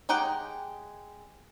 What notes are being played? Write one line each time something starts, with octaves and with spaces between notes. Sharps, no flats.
G#3 D#4 G4 F#5 G5